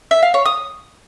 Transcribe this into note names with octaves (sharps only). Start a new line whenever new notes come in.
E5
F5
C#5
D#6